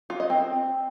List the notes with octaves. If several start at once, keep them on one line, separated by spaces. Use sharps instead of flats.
F4
D#5
C4